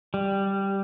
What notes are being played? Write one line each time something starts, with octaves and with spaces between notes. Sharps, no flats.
G3